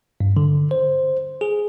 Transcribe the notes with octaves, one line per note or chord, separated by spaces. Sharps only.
G2
D3
C5
G#4